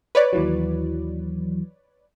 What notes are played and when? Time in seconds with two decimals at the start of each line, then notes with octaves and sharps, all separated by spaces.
0.15 B4 C#5 D5
0.33 D#2 E3 F#3